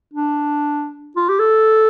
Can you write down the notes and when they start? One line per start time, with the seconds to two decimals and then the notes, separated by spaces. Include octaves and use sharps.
0.13 D4
1.16 F4
1.28 G4
1.40 A4